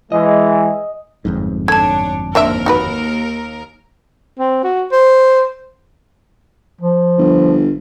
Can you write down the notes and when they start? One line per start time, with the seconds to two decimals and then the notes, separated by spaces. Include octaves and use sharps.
0.12 E3 G#3 D#5
1.25 G1 F2 G#2
1.68 D4 A4 C#5 A5 G#6
2.35 D#2 C4 D4 A#4 E5
2.66 D#4 F#4 B4
4.39 C4
4.64 F#4
4.92 C5
6.81 F3
7.18 G1